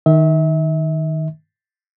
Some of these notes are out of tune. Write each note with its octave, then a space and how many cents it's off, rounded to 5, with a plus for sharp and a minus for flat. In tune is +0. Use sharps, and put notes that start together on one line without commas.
D#3 +0 E5 -35